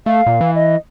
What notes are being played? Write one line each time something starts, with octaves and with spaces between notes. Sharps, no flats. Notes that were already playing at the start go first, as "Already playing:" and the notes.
A3 F5
A#2
E3
D#5